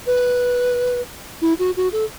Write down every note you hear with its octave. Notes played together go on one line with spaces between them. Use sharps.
B4
E4
F#4
F#4
A4